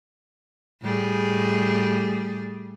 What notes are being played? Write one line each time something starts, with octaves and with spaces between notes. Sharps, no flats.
A2 G3 G#4